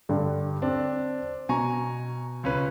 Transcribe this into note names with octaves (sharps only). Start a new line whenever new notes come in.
G2 D3 G3
C4 D4
B2 G#5 A#5 C#6
C#2 C#4 B4